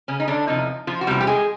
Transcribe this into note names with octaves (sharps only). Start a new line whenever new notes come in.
C#3 C#4
D#4
D3 D4
E2 C3 F3 D#4
F3 F4
F#4
E2 C3 F3 G3 G4
G4
G#3 G#4